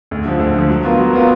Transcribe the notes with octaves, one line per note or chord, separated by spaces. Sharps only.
D2
D3 F3
D2
D3 F3
F#3
B3 F4 A#4
F#3
B3 F4 A#4